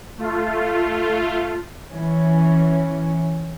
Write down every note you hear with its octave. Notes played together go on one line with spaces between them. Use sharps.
A3 F4
E3 C#4